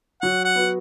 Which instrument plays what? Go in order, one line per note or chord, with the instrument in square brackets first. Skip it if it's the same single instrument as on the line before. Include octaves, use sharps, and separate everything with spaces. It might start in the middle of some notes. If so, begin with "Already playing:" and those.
[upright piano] F#3 [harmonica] F#5
[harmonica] F#5
[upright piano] B3 F#4